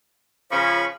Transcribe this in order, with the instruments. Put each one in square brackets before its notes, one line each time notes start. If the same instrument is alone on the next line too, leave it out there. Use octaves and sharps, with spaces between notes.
[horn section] C#3 F3 [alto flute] C#5 [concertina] B5 C#6